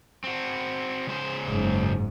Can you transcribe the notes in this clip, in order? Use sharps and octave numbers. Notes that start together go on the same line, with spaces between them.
C4 F#4
C#3 G#3 C5
F#1 G#2